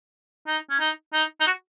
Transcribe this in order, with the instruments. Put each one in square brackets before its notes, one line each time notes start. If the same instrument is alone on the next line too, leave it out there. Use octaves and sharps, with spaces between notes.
[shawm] D#4
C#4
D#4
D#4
D#4
F#4